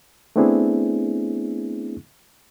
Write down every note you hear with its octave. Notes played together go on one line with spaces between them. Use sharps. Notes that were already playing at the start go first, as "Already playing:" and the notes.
A3 B3 C4 D4 E4 G#4